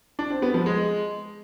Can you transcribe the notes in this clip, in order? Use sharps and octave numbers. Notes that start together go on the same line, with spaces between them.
D4
C4
B3
F3
G#3